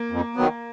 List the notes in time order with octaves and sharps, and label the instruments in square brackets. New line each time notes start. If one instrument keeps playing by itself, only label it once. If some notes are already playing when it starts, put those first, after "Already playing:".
Already playing: [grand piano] A#3
[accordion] F2
D#3 F#3 B3